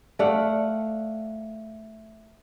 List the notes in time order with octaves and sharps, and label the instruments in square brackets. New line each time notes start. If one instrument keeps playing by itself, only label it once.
[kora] A3 D5 F5 F#5